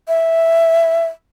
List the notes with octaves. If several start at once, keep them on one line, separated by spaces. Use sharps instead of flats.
E5